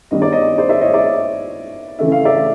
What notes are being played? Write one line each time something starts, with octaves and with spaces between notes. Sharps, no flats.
G2 D#3 G3 B3 D4 D#5
D5
C#5 D#5
C5 D5
D5 E5
C#5 D#5
D5 E5
C#3 E3 A3 D4 E5
F5
D5 E5